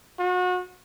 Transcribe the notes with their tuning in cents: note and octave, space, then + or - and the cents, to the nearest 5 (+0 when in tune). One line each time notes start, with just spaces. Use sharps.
F#4 -35